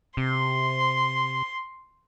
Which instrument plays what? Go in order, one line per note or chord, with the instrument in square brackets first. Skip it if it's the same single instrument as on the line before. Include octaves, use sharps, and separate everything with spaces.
[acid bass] C3 [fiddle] C6